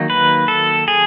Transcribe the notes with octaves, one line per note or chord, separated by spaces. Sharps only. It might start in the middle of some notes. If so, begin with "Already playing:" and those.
Already playing: D#3 F#3 A#3 D#4
B4
A4
G#4